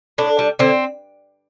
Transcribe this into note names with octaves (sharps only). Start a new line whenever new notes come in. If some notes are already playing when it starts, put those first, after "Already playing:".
A2 D4
G3
D3 C4